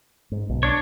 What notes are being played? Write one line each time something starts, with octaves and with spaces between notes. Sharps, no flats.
G#2
B1
D4 C#5